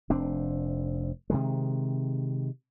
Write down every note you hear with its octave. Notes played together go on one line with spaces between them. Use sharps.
F1 C4 D4
C3 D#3 G#3